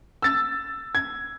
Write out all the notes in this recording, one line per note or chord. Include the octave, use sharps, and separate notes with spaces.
E6 A6
G#6